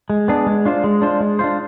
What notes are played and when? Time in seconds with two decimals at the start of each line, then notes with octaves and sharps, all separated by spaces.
0.10 G#3
0.28 B3 D4 G#4
0.47 G#3
0.65 D4 F4 C5
0.84 G#3
1.02 D4 F4 C5
1.20 G#3
1.39 D4 F4 C5